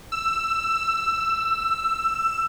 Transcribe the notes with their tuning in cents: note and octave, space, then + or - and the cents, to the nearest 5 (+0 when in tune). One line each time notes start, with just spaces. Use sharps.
E6 +15